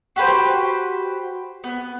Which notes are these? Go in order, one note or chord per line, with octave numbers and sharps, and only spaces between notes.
F#4 G4 B4 C5
B3